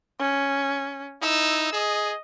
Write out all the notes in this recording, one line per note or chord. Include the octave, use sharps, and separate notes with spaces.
C#4
D#4 E4 E6
G#4 D#5